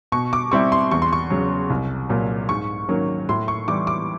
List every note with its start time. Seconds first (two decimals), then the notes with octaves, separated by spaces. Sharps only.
0.12 B2 C#6
0.33 D6
0.52 G3 C4 E4 C#6
0.72 C6
0.91 E2 C#6
1.02 C6
1.13 C#6
1.30 C#3 F#3
1.70 C2
2.09 A#2 F#3
2.49 G#2 C#6
2.89 D#3 F#3 A#3 C#4
3.29 A2 C6
3.48 C#6
3.68 E3 G3 D6
3.87 D6